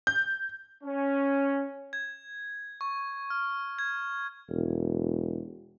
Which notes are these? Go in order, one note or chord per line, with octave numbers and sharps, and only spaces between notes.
G6
C#4
G#6
C#6
F6
G#6
E1